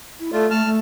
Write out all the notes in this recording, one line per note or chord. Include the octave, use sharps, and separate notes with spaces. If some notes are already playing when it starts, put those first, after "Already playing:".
E4
A3 F4 D5
A3 A5 F6
A3